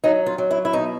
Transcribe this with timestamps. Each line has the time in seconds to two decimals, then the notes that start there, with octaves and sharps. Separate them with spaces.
0.04 F#3 D#4
0.26 F4
0.38 F#3
0.51 E4
0.65 E4
0.73 B2 D#4